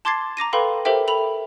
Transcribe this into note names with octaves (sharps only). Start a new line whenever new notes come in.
A5 C6 D6 G#6 A6 C7
A#5 D6 A#6 D#7
A4 B4 F5 G5 B5 C6
G4 A4 A#4 C5 E5 G5
A4 B5 F7 F#7